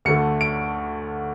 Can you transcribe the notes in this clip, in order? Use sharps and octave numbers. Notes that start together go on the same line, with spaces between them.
D2 D3 A3 C#7
D7